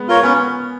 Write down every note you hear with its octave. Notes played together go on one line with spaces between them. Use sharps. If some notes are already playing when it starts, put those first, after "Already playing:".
Already playing: G#3 B3
F4 A#4 C#5
B3 C#4